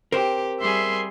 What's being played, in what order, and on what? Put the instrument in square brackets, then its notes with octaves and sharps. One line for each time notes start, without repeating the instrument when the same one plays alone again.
[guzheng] C4 [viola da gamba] G4 [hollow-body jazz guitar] A#4 C5
[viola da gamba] G3 G#4 [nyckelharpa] E5 C6